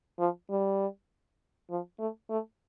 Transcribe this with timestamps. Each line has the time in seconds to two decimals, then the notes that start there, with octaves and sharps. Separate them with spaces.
0.19 F3
0.50 G3
1.70 F3
1.99 A3
2.30 A3